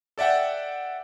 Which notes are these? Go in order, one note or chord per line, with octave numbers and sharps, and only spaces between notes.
A4 D5 E5 F#5 G5